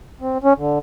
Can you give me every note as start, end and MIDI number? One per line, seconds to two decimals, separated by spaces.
0.21 0.38 60
0.44 0.53 61
0.58 0.79 50